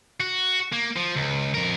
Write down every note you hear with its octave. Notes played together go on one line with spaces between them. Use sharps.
F#4
A#3
F3
C#2
F2 A#4